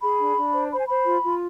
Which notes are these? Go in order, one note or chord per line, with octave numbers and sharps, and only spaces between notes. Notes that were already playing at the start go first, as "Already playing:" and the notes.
G#4 B5
D4
D4
C5
C5 B5
G#5
C5 B5
F4
F4